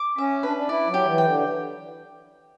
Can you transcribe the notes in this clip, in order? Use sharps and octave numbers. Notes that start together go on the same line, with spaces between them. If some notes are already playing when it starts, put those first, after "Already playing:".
Already playing: D6
C#4 E5
D4 B4
D4
E4 D5
F#3
G4
E3
G5
D3